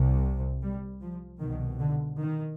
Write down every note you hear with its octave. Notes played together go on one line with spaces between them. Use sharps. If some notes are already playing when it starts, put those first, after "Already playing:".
Already playing: C2 C3
G3
F3
C2 B2 D#3
D3
D#3